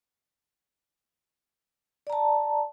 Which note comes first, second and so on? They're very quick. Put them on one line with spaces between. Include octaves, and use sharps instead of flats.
D5 A#5 A5